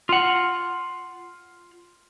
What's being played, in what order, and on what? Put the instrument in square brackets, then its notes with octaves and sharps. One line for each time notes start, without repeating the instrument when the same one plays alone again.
[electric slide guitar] F4 F#5